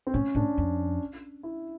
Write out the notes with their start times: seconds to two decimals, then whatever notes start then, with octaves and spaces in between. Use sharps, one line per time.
0.07 C4
0.14 A2 C#4
0.35 A2 D4
0.58 F2
1.43 E4